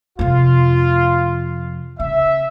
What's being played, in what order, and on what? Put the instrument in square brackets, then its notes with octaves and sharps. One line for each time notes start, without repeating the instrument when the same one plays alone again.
[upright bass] F2 C3 [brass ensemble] F4
[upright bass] C#3 [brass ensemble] E5